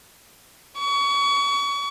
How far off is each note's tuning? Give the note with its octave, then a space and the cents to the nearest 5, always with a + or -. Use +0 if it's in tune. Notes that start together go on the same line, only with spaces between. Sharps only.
C#6 +30